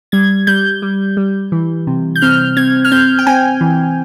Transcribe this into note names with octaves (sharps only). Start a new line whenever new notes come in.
G3 G#6
G3 G6
G3
G3
E3
C3
G6
C4 F6
C4 G#6
F6
C4 G6
G5
C4 G#5
E3